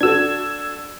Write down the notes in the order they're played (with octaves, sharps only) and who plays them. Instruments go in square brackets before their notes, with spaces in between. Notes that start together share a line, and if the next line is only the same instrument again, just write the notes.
[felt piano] D4 F#4 A4 [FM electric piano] E6 G#6